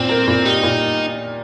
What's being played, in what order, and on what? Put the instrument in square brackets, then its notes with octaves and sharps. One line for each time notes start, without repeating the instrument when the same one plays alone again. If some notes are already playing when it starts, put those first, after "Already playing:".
Already playing: [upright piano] A#2 A#3 [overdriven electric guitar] C4
[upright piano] A#4
A#2
[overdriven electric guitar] D#4 [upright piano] G4
[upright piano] A#2